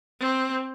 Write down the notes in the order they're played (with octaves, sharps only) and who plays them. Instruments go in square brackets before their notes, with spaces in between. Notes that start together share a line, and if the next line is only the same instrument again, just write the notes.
[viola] C4